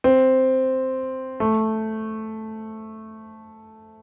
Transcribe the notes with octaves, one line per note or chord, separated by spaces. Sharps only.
C4
A3